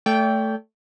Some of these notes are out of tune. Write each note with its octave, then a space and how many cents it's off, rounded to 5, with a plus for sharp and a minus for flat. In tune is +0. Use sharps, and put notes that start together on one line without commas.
A3 +0 D5 -40 G5 +0